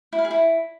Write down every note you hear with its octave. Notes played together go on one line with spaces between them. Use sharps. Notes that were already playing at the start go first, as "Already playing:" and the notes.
E4
F5
G#4
E4